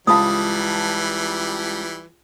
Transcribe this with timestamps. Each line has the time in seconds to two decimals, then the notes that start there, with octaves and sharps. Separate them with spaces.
0.07 C#2 E3 G3 F5 A5 B5 D#6